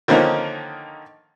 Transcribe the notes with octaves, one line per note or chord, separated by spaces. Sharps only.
D3 D#3 F3 A#3 C#4 D#4